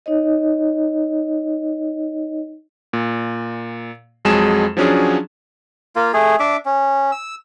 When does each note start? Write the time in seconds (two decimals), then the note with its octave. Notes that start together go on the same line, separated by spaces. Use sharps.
0.06 D#4 C#5 D#5
2.93 A#2
4.25 F2 F#3 G#3 G#4 A5 E7
4.77 F3 F#3 C#4 D4 G#4
5.96 A#3 F4
6.14 A3 G#4
6.40 D4 E5 D6
6.65 C#4
7.12 E6